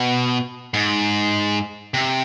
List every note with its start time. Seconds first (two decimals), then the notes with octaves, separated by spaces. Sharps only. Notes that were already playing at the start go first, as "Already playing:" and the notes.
Already playing: B2
0.74 G#2
1.94 C3